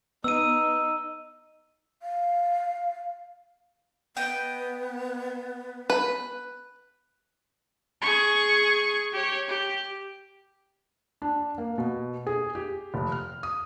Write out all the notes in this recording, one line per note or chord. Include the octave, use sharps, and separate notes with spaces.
B3 D#4 E6 D#7
F5
B3 D#5 G5
B4
G#4 C#6
G4 C#5
G4
D4
A#3
B2
G#4
G4
F1
F6
D#6